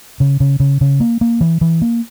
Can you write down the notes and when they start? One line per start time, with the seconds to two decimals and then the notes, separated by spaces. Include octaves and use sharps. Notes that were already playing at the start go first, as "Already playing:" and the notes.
0.20 C#3
0.40 C#3
0.60 C#3
0.81 C#3
1.00 A#3
1.21 A#3
1.41 E3
1.61 E3
1.82 A#3